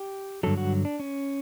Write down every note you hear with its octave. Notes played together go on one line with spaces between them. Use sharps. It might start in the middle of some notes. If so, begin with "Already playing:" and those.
Already playing: G4
G2 D3 F#3 A4
F#4
D4
C#4